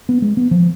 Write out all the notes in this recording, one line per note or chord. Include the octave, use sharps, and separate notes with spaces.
B3
G#3
B3
F3